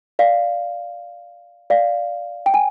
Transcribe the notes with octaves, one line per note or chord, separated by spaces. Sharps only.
D5 F5
D5 F5
G5
G#5